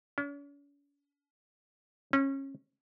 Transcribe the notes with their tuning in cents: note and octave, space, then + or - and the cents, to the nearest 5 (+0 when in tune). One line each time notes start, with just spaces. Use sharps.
C#4 +45
C#4 -25